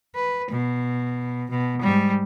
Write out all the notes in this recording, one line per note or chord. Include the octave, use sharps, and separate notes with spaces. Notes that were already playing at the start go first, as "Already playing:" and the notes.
B4
B2
B2
G#2 G3